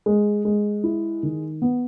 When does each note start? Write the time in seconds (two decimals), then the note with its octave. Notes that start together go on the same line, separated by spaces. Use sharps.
0.06 G#3
0.45 G#3
0.84 E4
1.23 D#3
1.62 B3